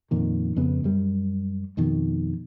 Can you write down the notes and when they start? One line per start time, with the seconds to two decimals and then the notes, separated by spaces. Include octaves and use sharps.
0.11 F2 A#2 D#3
0.56 F2 C#3 B3
0.84 F#2 G3
1.77 F2 B2 D#3